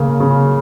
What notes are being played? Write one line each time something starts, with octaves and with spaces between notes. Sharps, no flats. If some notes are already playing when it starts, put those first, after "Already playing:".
Already playing: C#3 A#3
C#3